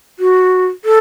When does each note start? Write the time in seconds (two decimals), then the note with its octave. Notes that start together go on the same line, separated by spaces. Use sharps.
0.19 F#4
0.85 A4